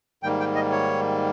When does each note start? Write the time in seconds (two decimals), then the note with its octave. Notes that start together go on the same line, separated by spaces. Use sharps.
0.23 G#2 D#3 G3 A#3 G5
0.40 G5
0.55 D#5
0.71 C#5